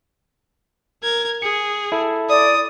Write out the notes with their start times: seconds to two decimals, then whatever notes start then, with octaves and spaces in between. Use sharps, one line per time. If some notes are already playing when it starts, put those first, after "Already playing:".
1.03 A#4 G#6
1.42 G#4 C#7
1.92 E4 A4
2.29 D5 D#6